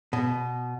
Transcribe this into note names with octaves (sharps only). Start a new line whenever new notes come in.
B2